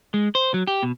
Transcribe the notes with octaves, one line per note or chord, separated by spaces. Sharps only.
G#3
C5
F#3
G4
B2